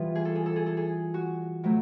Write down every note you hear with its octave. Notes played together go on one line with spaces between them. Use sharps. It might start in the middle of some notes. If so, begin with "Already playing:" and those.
Already playing: E3 G3 B3 F4
G#4
A4
G#4
A4
G#4
A4
G#4
F#4
A2 F#3 A3